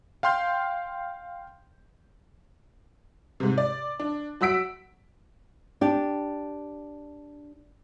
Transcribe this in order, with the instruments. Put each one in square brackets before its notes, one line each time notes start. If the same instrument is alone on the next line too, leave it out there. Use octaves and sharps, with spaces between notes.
[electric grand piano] F5 G5 C6 F6 G6
[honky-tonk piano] G#2 C3
D5
D4
F#3 F#4 E6 B6 D7
[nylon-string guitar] D4 G4